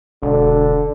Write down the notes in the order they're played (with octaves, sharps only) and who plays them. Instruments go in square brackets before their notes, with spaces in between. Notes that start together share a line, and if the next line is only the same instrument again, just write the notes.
[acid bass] E1 [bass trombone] D3